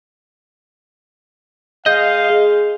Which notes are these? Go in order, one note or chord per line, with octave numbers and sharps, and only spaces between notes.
G#3 D#5 F5 G6
G#4